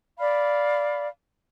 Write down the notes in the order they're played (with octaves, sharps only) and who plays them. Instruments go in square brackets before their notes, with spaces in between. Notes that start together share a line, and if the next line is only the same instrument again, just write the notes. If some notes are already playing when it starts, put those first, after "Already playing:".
[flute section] D5 F5 B5